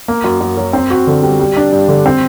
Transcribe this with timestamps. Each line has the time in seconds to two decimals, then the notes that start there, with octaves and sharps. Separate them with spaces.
0.08 A#3
0.24 F#2
0.41 F#2
0.57 F#3
0.73 C4
0.90 F#4
1.07 D3
1.23 G3
1.39 G3
1.57 D4
1.72 G2
1.88 D3
2.06 C4